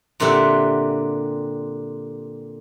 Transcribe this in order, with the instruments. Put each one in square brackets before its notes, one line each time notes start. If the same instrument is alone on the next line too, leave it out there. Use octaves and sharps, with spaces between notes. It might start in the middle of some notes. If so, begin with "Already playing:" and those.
[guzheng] A#2 D3 C4 G4 E5 F#5